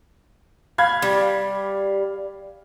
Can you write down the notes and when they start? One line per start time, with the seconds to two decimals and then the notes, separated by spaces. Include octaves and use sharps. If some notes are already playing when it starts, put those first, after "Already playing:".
0.78 F5 B5 G#6
1.02 G3